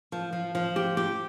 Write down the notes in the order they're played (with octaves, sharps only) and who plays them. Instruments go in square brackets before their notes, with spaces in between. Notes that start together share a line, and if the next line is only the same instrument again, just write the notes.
[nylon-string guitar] F3
F3
F3
G4
G4